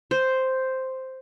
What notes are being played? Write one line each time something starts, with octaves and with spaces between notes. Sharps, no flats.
C5